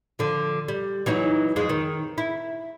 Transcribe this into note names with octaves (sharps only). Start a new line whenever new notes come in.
D3 F3
G3
E3 F#3 D#4
F2 G#3
D#3
E4